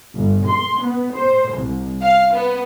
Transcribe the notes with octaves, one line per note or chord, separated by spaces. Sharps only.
G1
C6
B3
C5
C2
F5
B3